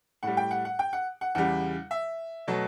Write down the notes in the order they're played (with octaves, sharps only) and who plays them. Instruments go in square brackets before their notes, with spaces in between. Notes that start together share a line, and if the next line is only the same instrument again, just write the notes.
[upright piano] A2 G3 F#5
G5
F#5
F#5
G5
F#5
F#5
E2 C#3 G3 F#5
E5
B2 F#3 A3